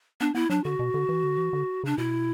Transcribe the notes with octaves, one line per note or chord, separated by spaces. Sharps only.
B3 D4
B3 E4
F#3 D4
D3 F#4
B2
D3
E3
D3
E3
D3
C#3 D4
B2 E4